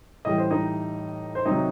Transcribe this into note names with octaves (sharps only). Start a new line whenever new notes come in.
A2 E3 G3 D#5
C5
D#4 D#5
C5
C3 D#3 F#3 D#4 D#5